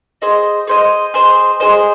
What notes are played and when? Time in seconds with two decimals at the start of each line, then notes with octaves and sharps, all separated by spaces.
0.22 G#4 C5 D#5
0.67 G#4 C5 D#5
1.14 G#4 C5 D#5
1.60 G#4 C5 D#5